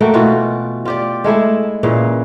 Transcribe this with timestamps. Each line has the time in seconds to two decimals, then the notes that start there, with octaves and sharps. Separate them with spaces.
0.01 A3 A#3 F#4 G5
0.14 B2 E3 F4 F#4
0.85 F4 G4 D5
1.24 G#3 A3 E4 G#4
1.83 A#2 C#3 E3 F5